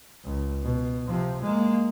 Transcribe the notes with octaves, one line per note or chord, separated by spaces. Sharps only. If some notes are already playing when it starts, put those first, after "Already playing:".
C#2
B2
C3 F3
G#3 A#3